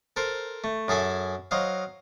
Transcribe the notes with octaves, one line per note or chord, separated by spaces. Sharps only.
A4 A#4 C5
A3
F#2 G#4 A4 E5 G#5
F#3 C5 D#5 F5